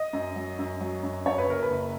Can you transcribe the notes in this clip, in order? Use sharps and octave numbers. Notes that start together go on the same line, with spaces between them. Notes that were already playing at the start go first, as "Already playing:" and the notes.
Already playing: D#5
F#2
F#3
F#2
F#3
F#2
F#2 C#5
B4
F#1 A#4
B4
F#1